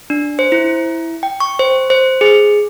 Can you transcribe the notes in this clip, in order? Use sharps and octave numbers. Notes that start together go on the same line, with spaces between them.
D4
C5
E4
G5
C#6
C5
C5
G#4